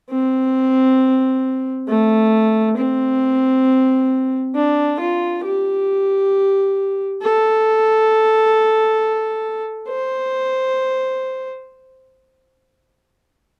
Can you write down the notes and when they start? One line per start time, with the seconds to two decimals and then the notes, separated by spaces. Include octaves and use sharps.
0.10 C4
1.88 A3
2.77 C4
4.55 D4
5.00 F4
5.44 G4
7.22 A4
9.89 C5